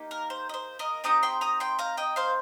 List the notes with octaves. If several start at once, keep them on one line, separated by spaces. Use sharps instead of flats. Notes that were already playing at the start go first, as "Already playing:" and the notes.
Already playing: A#3 D#4 G4
A#4
C5
D#5
C5
A#4 D#5
C4 D#4 G4 A#5 D#6
G5 C6
A#5 D#6
G5 C6
F5 A#5
D#5 G5
C5 F5